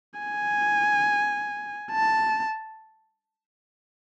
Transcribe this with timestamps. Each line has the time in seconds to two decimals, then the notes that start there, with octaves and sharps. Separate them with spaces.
0.20 G#5
1.92 A5